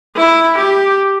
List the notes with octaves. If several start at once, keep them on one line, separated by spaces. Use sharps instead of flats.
E4
G4